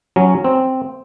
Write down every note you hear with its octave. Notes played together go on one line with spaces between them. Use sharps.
F#3 C#4
C4